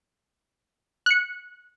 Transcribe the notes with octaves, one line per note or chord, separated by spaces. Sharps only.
F#6 C#7